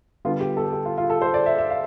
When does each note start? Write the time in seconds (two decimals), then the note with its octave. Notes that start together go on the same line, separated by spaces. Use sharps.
0.25 D3 G3 B3 F4
0.41 G4
0.57 A4
0.73 G4
0.85 F4
0.98 F4
1.10 A4
1.22 C5
1.34 D5
1.46 E5
1.58 E5
1.70 F5